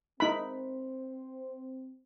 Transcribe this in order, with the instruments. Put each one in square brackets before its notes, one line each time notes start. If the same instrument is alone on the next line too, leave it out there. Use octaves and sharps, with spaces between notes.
[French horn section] C4 [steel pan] D#4 B5